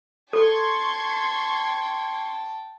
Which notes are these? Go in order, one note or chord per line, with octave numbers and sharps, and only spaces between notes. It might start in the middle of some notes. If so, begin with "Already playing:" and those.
A4 G5 A5 C6 C#6 G#6